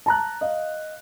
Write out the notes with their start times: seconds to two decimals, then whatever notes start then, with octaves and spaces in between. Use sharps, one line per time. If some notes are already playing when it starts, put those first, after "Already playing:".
0.06 A5 A#5 F#6
0.41 D#5 F5